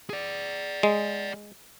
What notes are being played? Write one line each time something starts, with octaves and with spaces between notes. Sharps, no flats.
G#4 D5
G#3